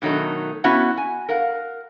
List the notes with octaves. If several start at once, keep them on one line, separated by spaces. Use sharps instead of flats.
B2 D#3 F#3 A3 D#4
B3 C#4 E4 F#4 F#5
G#5
A#4 F5 F#5